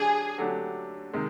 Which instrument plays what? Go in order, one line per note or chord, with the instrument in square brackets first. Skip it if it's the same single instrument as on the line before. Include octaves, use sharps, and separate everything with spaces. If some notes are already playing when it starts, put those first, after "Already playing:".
Already playing: [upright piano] D3 F#3 D4 G4 [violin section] G#4
[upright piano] D3 F#3 A3 D4 G4
C3 D#3 G#3